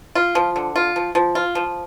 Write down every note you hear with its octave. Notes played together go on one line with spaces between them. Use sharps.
F4
F3
D3
F4
F3
F3
F4
F3